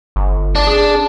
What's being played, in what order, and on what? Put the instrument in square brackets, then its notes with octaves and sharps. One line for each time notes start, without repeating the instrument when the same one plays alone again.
[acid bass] G1
[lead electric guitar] D4
[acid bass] G#4